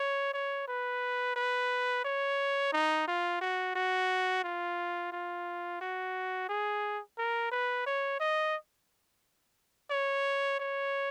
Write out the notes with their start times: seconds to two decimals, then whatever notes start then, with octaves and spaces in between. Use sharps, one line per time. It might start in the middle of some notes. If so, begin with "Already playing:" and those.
Already playing: C#5
0.33 C#5
0.68 B4
1.36 B4
2.04 C#5
2.72 D#4
3.08 F4
3.41 F#4
3.75 F#4
4.44 F4
5.12 F4
5.81 F#4
6.49 G#4
7.18 A#4
7.51 B4
7.86 C#5
8.20 D#5
9.91 C#5
10.59 C#5